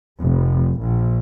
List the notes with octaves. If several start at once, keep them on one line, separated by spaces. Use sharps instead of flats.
F1
A#1